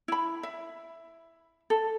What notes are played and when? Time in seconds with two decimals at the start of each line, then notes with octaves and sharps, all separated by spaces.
0.08 E4 B5
0.43 E5
1.70 A4